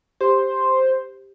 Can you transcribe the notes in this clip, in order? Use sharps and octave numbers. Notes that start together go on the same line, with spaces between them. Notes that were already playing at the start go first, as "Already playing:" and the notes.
G4 C5